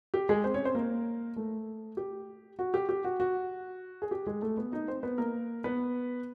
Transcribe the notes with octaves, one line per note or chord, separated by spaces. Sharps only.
G4
G#3 G#4
C4 C5
C#4 C#5
C4 C5
A#3 A#4
A3 A4
G4
F#4
G4
G4
F#4
F#4
G#4
G4
G#3 G#4
A3 A4
B3 B4
D#4 D#5
C4 C5
B3 B4
A#3 A#4
B3 B4